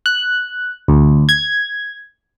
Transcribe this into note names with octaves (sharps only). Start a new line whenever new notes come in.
F#6
D2
G#6